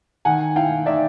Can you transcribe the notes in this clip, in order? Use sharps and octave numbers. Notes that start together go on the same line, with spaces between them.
D#3 F#5 G#5
E4 F5 G5
D#3 D5 E5